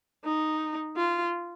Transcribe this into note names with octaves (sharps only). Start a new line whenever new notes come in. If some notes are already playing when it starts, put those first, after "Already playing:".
D#4
F4